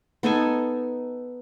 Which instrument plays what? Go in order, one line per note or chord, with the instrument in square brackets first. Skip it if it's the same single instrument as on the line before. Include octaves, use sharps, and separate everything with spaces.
[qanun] B3 D#4 A4 G#5